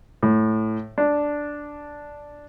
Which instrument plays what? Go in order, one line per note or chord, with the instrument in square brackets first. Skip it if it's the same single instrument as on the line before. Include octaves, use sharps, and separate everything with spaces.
[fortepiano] A2
D4